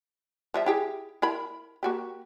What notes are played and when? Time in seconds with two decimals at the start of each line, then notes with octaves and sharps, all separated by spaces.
0.54 F3 G3 E5
0.66 E4 G4 G#4
1.22 E4 A#4 B5
1.83 A#3 F#4 G4